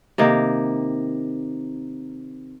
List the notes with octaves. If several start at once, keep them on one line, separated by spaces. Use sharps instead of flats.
C3 D#3 A#3